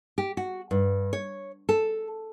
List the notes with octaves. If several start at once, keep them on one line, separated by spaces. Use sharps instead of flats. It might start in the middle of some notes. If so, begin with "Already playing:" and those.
G4
F#4
G2
C#5
A4